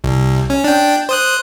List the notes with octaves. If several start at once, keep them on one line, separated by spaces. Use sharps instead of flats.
C2
C#4
D4 G5
C5 D#6 F#6